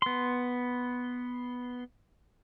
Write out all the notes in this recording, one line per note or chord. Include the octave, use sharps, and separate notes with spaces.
B3 C6